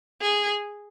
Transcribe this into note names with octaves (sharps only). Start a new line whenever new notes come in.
G#4